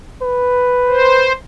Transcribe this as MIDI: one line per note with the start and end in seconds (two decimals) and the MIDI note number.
0.22 1.31 71
0.88 1.32 72